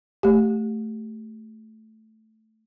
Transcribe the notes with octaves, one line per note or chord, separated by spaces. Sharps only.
A3 G4